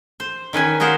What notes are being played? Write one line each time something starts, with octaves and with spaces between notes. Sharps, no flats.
C5
D#3 C#4 B4 G#5
F#4 G#4 A#4 C5 F5 F#5